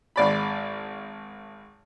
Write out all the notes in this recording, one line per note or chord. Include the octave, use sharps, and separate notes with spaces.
G#1 D5 B5